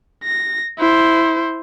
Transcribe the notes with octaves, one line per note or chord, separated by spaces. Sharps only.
A#6
E4 C5